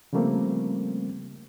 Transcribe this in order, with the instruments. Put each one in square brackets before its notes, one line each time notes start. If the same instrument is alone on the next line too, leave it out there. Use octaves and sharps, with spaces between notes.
[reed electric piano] C#3 F3 G3 A3 A#3 C4